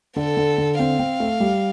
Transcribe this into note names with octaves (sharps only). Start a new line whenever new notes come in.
D3 A4
D3
D3
C4 F5
C4
A3
G3